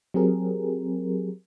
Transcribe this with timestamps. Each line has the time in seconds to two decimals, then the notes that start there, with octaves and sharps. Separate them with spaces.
0.14 F#3 C4 G4 G#4 A#4